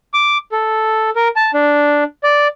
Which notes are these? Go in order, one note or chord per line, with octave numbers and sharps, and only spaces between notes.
D6
A4
A#4
A5
D4
D5